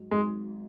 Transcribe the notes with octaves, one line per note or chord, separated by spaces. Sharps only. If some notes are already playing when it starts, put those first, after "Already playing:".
Already playing: G#2 F#3
G#1 G#2 F#3 G#3